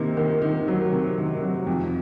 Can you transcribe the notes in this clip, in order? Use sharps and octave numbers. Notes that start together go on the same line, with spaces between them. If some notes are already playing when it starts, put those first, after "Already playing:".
Already playing: C3 D#3 A#3
D#3
D#3
F#3
C3
D#3
F#3
F2